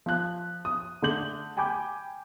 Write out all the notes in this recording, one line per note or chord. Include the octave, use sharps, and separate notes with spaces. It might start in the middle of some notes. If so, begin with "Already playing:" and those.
F3 F#6
D#6
D3 A3 D6 G6 F#7
G5 G#5 B5 D6 G6